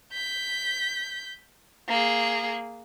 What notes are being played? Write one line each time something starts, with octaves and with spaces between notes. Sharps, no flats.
G6 B6
A#3 G#4